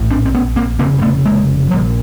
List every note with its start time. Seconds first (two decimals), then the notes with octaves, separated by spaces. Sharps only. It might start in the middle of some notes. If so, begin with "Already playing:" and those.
Already playing: A#1 A2
0.10 C4 D4
0.25 C4
0.34 B3 C#4
0.56 A#3 C4
0.79 F1 D#2 C#3 A#3 C4
0.99 A#3
1.02 A3 B3
1.26 G#3 A#3
1.70 A#1 A#2 F3 G3